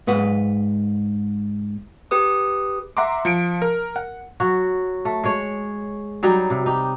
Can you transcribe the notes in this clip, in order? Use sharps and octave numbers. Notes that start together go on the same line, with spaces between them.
G#2 B4 F#5
G4 B4 D#6
E5 F#5 A#5 C6 D6
F3 C#7 D7
A#4
F#5
F#3 F#4
A3
G#3 C#5
F#3 G3 D#4
C3
D#4 G4